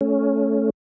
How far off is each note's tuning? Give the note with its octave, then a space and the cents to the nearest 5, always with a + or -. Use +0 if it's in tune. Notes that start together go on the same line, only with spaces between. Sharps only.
A3 -10 C#4 +5